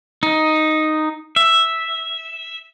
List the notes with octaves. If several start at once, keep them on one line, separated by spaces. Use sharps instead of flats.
D#4
E5